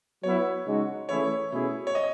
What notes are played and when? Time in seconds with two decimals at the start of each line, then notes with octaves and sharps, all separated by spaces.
0.23 F#3 B3 E4 C#5
0.67 C#3 G#3 D#4 F#4
1.09 E3 A3 C#4 E4 G#4 C#5
1.52 B2 A3 C#4 E4 G#4
1.87 C#5
1.95 D#5